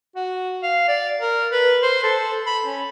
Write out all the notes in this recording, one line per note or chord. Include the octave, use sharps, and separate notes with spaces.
F#4
F5
D5
A#4
B4
C5
A4
B5
C#4